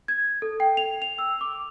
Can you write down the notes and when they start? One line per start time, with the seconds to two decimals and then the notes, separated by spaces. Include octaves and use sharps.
0.08 G#6
0.42 A4
0.60 G5
0.77 F7
1.02 F7
1.18 E6
1.41 D6